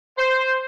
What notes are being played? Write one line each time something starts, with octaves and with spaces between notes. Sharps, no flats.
C5